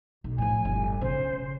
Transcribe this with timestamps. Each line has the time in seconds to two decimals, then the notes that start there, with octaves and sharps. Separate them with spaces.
0.24 B1
0.38 A2 F3 G#5
0.65 G1
1.01 C#3 C5